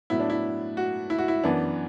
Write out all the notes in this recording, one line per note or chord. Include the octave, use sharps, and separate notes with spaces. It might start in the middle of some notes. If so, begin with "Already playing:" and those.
A2 F#3 B3 E4
D4
E4
F#4
E4
F#4
E4
F#2 E3 B3 D4